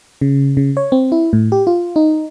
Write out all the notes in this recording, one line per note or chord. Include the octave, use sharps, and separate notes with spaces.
C#3
C#3
C#5
C4
E4
A2
G4
F4
D#4